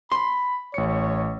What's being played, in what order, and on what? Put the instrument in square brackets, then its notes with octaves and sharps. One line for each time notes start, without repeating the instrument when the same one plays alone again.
[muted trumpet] B5 [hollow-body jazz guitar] C6
[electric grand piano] A1 C#7 [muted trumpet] C#5